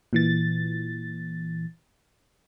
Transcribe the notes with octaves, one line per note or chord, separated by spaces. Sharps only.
A#2 E3 A6